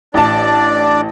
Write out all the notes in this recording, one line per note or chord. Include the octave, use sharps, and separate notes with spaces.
A1 D4 D5 A5